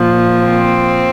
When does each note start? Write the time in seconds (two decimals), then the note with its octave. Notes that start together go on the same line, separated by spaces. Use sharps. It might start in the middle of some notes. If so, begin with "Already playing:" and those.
Already playing: A#2 F3
0.42 C4